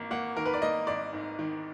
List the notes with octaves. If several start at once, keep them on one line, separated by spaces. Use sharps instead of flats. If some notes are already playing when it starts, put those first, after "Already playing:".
Already playing: G#1 A#3
A#3 F#5
D#3 A#4
B4
D5
A#3 D#5
G#1 D5
G#2
D#3